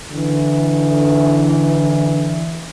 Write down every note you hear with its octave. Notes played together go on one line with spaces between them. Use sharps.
D3 E3